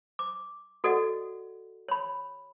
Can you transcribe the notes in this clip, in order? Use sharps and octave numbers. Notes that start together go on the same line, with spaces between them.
D6
F#4 A4 D5 D#5 F#5
C#5 B5